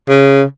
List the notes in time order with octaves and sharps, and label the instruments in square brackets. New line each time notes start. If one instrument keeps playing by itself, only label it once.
[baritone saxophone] C#3